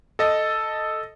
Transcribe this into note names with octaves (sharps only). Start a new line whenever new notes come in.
A4 D#5